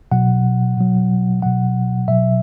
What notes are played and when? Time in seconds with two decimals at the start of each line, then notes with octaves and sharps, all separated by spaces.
0.11 B2 F#3 F#5
0.77 B2 F#3
1.42 B2 F#3 F#5
2.08 B2 F#3 E5